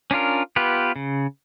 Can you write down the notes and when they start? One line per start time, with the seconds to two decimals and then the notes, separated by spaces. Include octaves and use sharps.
0.11 C#4 D4 F4 A#4
0.56 B3 F4 G4 B4
0.96 C#3